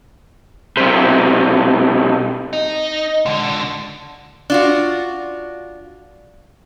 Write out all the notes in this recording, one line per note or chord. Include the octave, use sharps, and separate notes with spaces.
B1 C3
D#4
D3 G#3
D4 F4 F#4